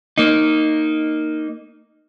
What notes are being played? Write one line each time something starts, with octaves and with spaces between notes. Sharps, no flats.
A#3 D#4